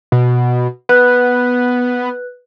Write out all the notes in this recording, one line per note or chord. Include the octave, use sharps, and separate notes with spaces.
B2
B3 B4 F#6